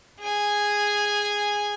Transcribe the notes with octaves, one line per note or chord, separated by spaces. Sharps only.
G#4 G#5